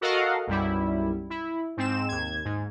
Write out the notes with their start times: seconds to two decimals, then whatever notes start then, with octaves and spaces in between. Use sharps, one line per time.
0.01 F#4 A4 A#4 D#5 F5 F#5
0.47 B1 F#2 G3 E4
1.30 E4
1.77 G#2 C4 E7
2.09 D#2 G#6
2.45 G#2